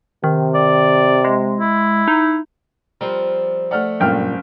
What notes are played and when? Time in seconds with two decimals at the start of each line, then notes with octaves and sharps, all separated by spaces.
0.24 C3 D#3
0.54 D5
1.25 G#3
1.60 E4
2.08 D#4
3.01 F3 G3 C4 A#4
3.71 A3 D5 F#5 F6
4.00 F#1 G2 A#2 A#3 G5 F6